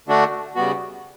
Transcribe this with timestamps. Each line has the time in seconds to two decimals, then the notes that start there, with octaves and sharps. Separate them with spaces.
0.08 D3 A3 D4 F#4
0.55 C#3 G3 B3 F#4